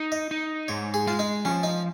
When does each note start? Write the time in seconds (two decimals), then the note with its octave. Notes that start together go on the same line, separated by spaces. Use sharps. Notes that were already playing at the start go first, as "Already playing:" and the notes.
Already playing: D#4
0.12 D#5
0.31 D#4
0.68 G#2 C#5
0.94 G#4
1.07 G#3 F4
1.19 D#4
1.45 F3 C#4
1.63 D#4